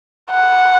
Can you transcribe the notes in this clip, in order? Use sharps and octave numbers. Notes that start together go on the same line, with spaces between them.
F#5